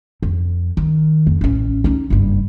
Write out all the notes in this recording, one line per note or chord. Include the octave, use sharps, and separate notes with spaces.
F2
D#3
F2
A1 C#4
C#4 D#4
F#1 G2